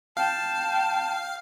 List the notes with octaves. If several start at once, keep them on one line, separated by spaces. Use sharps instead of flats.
F5 G5 A5